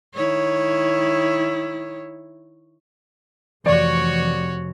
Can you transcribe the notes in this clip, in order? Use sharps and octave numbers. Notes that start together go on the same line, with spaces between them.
D#3 E4 C#5
F1 E3 F#4 C#5 D5